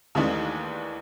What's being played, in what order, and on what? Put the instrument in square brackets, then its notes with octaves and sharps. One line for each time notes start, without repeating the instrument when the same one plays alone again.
[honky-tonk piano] D#2 D#3 E3 G#3 A3 D4